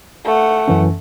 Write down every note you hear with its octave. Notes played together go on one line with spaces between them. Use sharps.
A3 F#5
F#2 E3 C#4